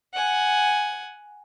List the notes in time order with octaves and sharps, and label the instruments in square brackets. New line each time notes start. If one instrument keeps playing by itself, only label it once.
[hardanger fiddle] F#5 G#5